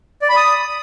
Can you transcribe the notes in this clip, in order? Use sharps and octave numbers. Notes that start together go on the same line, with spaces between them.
D5
B5
D#6